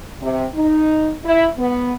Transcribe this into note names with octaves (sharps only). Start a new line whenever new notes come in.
C3
D#4
E4
B3